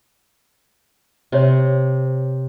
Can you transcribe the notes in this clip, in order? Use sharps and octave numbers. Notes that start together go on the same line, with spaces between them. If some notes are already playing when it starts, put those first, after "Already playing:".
C3 C5 C#5